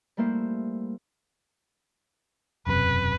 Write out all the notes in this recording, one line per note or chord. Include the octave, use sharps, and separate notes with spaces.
G3 A3 A#3 E4 C5
E1 F#2 C3 B4